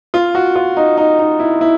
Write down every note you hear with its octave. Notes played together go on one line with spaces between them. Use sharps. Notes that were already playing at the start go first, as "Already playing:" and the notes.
F4
F#4
F4
D#4
D#4
D#4
E4
E4